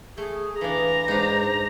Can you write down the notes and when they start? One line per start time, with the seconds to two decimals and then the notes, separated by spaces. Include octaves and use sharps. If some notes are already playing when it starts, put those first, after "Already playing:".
0.18 A3 G#4
0.61 E3 D4 F5 A#5
1.08 G#2 D4 D#4 C5